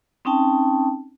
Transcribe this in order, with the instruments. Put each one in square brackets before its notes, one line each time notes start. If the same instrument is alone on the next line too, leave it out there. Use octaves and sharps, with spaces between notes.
[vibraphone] C4 C#4 D#4 G5 A5